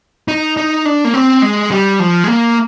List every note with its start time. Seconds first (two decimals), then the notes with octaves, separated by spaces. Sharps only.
0.28 D#4
0.57 D#4
0.85 D4
1.05 A#3
1.14 C4
1.42 G#3
1.71 G3
2.00 F3
2.24 G#3
2.28 A#3